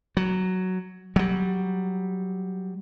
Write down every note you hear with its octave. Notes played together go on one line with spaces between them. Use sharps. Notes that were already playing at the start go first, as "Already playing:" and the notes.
F#3
F#3 G3